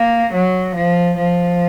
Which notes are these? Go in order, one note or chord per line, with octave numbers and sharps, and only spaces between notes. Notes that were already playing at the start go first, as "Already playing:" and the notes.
Already playing: A#3
F#3
F3
F3